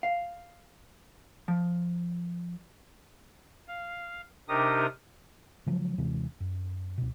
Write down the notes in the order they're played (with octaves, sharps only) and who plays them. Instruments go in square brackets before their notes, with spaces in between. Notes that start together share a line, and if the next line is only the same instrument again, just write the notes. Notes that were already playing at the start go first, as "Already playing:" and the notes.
[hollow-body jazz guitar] F5
F3
[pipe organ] F5
C3 D4 D#4 G4 A#4 D#6
[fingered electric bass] C#3 F3 F#3 G#3
D#2 C3 E3 G#3
F#2
C#2 B2